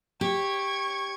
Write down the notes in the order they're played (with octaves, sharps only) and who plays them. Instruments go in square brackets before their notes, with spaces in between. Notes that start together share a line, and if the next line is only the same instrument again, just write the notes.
[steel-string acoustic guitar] G4 [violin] C#6 G#6